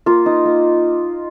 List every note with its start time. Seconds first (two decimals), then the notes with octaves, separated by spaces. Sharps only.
0.06 A#3 F4
0.26 D#4
0.45 A#3